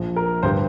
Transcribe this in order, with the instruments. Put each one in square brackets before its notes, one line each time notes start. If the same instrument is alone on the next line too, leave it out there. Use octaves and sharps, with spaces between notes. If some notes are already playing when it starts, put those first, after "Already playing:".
Already playing: [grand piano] A#1 A#2 F3
A#4
G1 G2 G3 C5